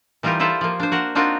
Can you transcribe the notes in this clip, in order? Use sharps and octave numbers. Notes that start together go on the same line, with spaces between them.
E3 G3 D#4 F4 G4 A#4
E4 F4 A4 C5 E5
F3 A#3
D4 C5
F#4 A#4 F#5
C4 D4 D#4 F4 F#4 A#4